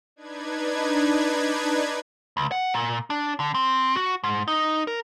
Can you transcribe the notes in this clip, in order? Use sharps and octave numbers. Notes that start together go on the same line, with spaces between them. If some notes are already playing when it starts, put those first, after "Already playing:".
D4 D#4 B4 G#6
C#2
F#5
A#2
D4
D3
C4
F#4
G#2
D#4
A#4